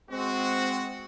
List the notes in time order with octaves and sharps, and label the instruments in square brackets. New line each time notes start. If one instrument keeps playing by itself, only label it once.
[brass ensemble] G#3 C4 F#4